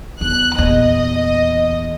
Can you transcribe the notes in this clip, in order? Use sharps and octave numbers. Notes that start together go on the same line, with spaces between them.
E2 F#6
E2 A#2 D#5